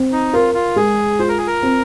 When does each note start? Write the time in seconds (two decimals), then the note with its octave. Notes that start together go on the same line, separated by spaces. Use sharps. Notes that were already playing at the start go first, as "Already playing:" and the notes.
Already playing: C4
0.12 D#4
0.33 F4 A#4
0.54 F4
0.76 G#3 G#4
1.19 F4 C5
1.29 A#4
1.38 G#4
1.47 A#4
1.63 C4